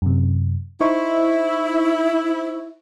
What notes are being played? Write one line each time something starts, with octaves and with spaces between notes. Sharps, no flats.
F#2 C3
D#4 E4 C5 C#6